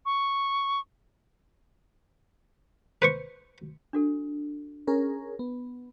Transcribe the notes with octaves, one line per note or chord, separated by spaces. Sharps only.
C#6
B4 C5 C#6
D4 F#4 A4
C#4 G#4 A#4
B3